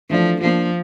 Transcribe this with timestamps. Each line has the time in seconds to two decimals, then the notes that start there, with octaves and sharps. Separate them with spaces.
0.10 E3 F3 A3 D4 A4 D5
0.41 F3 A#3 D4 F4